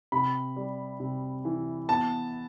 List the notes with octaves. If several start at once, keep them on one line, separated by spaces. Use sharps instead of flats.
C3 B5
G3
C3
E3
B3 A5